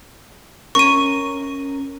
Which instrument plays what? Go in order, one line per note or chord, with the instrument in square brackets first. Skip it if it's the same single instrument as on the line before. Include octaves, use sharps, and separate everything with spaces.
[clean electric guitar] C#4 A#4 [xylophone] C#6 D#7